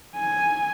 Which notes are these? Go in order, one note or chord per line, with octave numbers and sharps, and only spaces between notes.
G#5